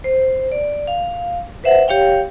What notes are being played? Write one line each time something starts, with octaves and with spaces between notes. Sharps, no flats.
C5
D5
F5
B4 C5 E5 F#5
G4 C#5 F5 G5